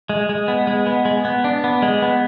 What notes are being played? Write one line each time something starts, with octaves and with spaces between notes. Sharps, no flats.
G#3
G#3
B3
G#3
B3
G#3
B3
D4
B3
G#3
B3